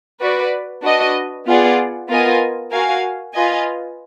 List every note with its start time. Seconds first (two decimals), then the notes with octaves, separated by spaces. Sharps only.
0.21 F#4 B4 D5
0.83 D4 F#4 B4 D#5
1.46 B3 F4 G#4 D5 F#5
2.09 B3 F4 A#4 D#5 G#5
2.72 F#4 A#4 F5 G#5
3.34 F4 B4 D#5 G#5